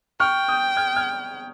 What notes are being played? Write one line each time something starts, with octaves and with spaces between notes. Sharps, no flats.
G5 C#6 F6
D#6 G6
F6 G#6
F6 G#6